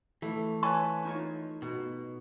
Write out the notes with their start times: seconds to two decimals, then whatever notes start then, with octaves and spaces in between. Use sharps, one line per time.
0.22 E3 A3
0.63 B4 C#5 G#5 A5 C#6
1.05 D#4 F4 C#5
1.62 B2